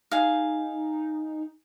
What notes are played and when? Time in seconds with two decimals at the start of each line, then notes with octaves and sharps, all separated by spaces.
0.11 D#4 G#4 F5